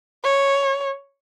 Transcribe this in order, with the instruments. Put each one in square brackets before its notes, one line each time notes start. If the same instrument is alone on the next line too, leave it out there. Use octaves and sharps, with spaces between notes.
[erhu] C#5